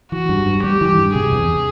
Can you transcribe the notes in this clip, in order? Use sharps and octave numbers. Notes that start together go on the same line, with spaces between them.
E3 F#4
G2
G2
G3 G4
E3
G2
C3 G#4
E2